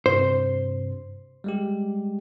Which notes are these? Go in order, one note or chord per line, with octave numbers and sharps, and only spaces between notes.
G2 C3 C5
G3 G#3 G4